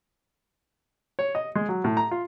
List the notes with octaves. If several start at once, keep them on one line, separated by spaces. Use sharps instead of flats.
C#5
D#5
G#3
F#3
A2
A#5
F4